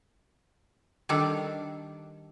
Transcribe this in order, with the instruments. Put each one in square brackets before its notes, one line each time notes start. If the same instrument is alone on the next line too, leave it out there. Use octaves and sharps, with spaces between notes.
[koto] D#3 G3 D4 A4